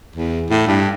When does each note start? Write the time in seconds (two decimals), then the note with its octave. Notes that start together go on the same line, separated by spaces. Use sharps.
0.15 E2
0.50 A2
0.67 G2